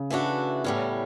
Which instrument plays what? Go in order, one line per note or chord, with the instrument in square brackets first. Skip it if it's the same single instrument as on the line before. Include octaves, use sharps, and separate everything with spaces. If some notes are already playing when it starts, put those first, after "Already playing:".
Already playing: [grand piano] C#3
[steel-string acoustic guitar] E3 A3 D4 F#4
[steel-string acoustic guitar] A2 G3 C#4 [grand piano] B3